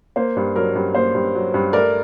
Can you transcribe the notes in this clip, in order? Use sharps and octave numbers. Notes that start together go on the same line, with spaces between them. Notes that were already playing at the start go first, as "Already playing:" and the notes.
A#3 C5
G2
F#3 A#4
G2
A#3 C5
G2
F#3
G2
A3 A#4 D5